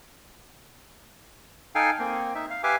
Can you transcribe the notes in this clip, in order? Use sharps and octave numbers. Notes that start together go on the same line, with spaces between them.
D#4 A4 F5 G5 G#5
A#3 C4
D#4 E5
F5
G4 B4 E5 F5 G#5 D6